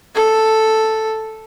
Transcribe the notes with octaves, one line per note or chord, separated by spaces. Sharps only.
A4